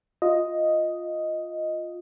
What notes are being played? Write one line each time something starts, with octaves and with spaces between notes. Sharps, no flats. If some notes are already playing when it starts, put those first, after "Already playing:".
F4 D#5